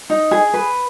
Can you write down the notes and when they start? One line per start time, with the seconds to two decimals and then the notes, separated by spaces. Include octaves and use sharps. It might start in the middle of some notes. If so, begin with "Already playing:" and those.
0.10 D#4
0.31 G#4
0.54 B4